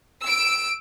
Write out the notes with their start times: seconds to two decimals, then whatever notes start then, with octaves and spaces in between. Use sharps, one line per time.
0.23 E6 D7